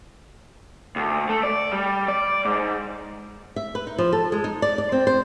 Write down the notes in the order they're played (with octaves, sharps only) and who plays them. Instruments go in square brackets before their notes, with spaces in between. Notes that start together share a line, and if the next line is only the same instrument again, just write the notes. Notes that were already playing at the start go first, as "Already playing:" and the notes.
[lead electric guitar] D2
A3
D5
G3
D5
G#2
[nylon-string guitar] E5
B4
D#4
F3
A4
G#3
D#4
D5
D5
C4
C5